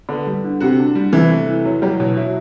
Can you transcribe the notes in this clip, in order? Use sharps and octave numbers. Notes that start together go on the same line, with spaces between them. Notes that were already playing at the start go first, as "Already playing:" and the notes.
D3 B3
G3
D3
C3 F#4
D4
G3
C3 E3
A3
E3
E2 F#3
F#3 G3
B2 F#3
F#3 E4